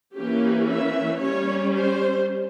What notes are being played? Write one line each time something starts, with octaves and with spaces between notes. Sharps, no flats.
E3 A#3 C#4 G4
E5
G3 C#4 C#5
C5